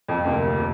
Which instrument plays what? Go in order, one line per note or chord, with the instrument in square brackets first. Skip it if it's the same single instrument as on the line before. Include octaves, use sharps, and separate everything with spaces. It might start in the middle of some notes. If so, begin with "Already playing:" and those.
[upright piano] F2
[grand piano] D2 C3 F3 A#3
C3